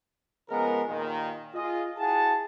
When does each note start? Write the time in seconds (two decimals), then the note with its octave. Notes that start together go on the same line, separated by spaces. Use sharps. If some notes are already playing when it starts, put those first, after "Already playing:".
0.50 C#3 F3 G#3 B3 A#4
0.88 D#2 A#2 D#3
1.54 F4 G#4 D#5
1.98 E4 F#4 G#4 F#5 A5